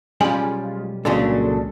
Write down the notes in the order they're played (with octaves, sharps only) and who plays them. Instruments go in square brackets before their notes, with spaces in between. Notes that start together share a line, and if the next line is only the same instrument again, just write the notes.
[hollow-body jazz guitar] B1 G3 C#4 [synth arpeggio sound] G#3 F4 [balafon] G#5
[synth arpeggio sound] C2 G#3 A4 [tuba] A#2 [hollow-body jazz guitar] C#3 F#3 D4